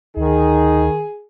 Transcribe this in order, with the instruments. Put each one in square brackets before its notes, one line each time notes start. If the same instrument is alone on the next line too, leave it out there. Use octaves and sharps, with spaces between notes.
[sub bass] D2 [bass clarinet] D#3 [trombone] D#4 [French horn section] G#4